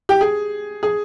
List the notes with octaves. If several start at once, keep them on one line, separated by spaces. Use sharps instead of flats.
G4
G#4
G#4